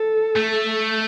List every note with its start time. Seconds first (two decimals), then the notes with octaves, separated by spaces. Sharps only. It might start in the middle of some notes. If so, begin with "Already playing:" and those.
Already playing: A4
0.36 A3